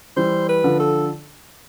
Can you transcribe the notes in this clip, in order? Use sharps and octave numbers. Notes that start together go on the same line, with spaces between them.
E3 G3 C5
B4
D3 F3
A4